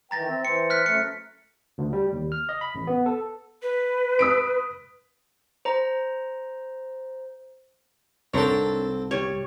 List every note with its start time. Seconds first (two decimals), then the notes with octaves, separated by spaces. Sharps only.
0.11 D#3 E3 G5 A#5 A6 A#6
0.28 C4 E5
0.45 E3 C5 C#7
0.70 F6 F#6 B6
0.86 F#2 A3 C#7
1.78 D2
1.93 G3
2.12 D#2
2.32 F6
2.49 D#5
2.61 B5
2.75 A1
2.87 B3
3.06 A4
3.62 B4
4.19 D#6 B6 D7
5.65 C5 A#5
8.34 C2 G#2 C4 D4 A4 A#4 C#5
9.11 G3 C#5